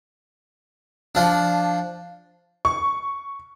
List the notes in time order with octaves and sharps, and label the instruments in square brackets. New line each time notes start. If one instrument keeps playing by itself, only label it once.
[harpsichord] F3 D4
[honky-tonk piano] C#6